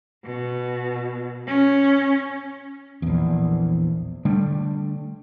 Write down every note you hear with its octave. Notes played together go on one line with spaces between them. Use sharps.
B2
C#4
A#1 E2
D3 G3 A3 D4